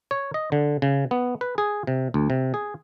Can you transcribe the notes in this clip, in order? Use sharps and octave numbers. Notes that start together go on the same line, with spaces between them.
C#5
D#5
D3
C#3
B3
B4
G#4
C3
D2
C3
G#4